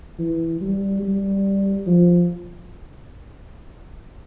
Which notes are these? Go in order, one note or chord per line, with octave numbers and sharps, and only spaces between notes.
E3
G3
G3
F3